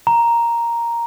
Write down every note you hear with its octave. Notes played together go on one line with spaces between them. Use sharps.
A#5